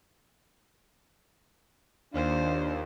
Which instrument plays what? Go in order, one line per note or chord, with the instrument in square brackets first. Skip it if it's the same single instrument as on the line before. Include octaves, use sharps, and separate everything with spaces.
[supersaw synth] D#2 [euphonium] D4 [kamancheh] F4 C5